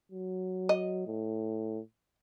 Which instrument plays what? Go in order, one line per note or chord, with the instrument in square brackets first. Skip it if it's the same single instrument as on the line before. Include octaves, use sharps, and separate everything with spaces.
[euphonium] F#3
[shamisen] D#5
[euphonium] A2